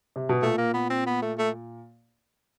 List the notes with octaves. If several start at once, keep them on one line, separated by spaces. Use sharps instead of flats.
C3
B2
A#2 A3
A#3
B3
C4
B3
A3
A3